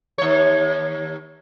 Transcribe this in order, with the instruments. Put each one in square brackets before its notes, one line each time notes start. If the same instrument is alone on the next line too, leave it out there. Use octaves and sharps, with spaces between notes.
[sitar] D#2 C#5